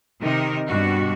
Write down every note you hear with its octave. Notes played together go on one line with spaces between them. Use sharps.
C3 D#3 D#4 A#4
G2 B2 G3 F#4